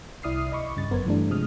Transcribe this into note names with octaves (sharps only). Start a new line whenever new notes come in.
C2 E4 D5 D#6 F6 C7
D#5 B5 C#6 D6
G2 C#3 A6
G1 F#2 B3 A#4 C5 G#6
G2 E3 G3 A3 D4
C3 F3 G#3 D#6 F6